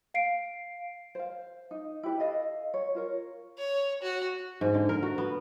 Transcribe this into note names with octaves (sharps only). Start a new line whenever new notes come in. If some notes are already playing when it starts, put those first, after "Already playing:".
F5 C7 D7
C5 F5
D#4
E4 G4 B4
A4 D#5 F5
C#5
F4 A#4 C#5
C#5
F#4
G#2
D3
A#4
F#4
B3